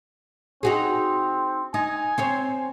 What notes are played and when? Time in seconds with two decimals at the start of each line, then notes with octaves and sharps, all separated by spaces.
0.63 C4 D#4 F#4 G#4
1.74 D#4 G#5
2.18 C4 C5 C#5